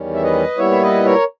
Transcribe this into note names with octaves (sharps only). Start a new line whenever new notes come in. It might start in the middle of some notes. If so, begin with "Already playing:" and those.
Already playing: E2 D#3 G3 C#4
E5
B4 D#5
A#2 G3 B3 E4 C#5 E5
E5
B4 D#5
A#4 C#5